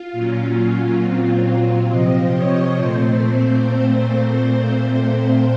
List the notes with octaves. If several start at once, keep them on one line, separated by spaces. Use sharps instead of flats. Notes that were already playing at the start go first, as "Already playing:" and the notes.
Already playing: F4
A#2 F#3 A#3 C#4
A#2 F#3 C4
C3 F3 C4 D#5
C#5
A#2 A3 C4 C5